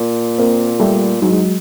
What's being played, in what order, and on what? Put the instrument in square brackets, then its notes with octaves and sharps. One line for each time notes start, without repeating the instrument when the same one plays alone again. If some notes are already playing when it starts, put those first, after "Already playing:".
Already playing: [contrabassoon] A#2
[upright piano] A#3 C4
G3 A3
[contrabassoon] G#2 [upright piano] F#3 G#3
[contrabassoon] G#2